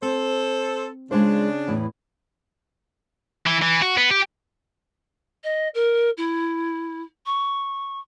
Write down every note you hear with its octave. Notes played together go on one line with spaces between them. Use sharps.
C4 A4 C5
C#3 G#3 D4 F4 C5
E2 A2 E3
E3
E3
F#4
B3
G4
D#5
A#4
E4
C#6